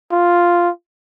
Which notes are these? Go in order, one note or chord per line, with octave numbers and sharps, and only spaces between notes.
F4